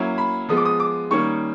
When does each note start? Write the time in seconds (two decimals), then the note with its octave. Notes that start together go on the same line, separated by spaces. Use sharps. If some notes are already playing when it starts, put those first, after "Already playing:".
Already playing: F#3 A#3 C#4 E4
0.18 B5
0.49 F3 G#3 B3 D#6
0.57 D6
0.65 D#6
0.80 D6
1.10 D#3 G3 A#3 C#4 C#6